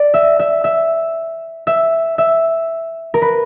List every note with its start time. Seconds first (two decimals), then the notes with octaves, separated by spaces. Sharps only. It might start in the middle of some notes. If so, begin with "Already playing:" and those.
Already playing: D5
0.14 E5
0.39 E5
0.64 E5
1.67 E5
2.18 E5
3.14 A#4
3.22 B4